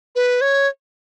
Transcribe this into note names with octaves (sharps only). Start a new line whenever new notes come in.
B4
C#5